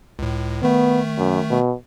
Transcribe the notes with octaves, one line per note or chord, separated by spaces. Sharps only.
C#2 A2
D#3 A3 B3
F#2
B2